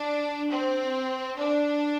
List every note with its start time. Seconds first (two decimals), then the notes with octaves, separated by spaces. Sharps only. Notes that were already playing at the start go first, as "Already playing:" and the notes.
Already playing: D4
0.51 C4
1.39 D4